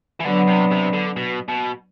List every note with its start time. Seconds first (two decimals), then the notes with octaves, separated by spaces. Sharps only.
0.20 E3
0.24 D3 F#3 B3 D4
0.47 C3
0.71 C3
0.93 D3
1.17 B2
1.48 B2